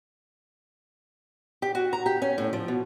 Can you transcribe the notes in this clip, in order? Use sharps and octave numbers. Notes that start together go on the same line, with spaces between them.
G4
F#4
A#5
G4
C#4
A2
F3
B2